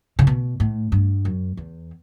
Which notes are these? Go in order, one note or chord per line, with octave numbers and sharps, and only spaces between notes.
C#3
B2
A2
G2
F#2
E2